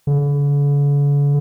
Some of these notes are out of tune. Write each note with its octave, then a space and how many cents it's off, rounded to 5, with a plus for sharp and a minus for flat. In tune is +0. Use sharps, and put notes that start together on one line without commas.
D3 -45